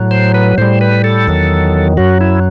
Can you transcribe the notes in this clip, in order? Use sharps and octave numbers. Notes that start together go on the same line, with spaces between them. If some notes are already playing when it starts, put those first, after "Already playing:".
Already playing: A2 F#3
C5
B4
A2 G3 C5
B4
A4
E2 D#3 F#3
F#2 F#3 F#4
E4